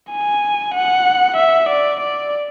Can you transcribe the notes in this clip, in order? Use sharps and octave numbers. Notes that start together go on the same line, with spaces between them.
G#5
F#5
E5
D5
D5